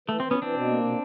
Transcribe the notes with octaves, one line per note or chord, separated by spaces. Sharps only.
E3 A3
C4
E3
B3 C#4
E3 C4 D4
B2
A#3
B2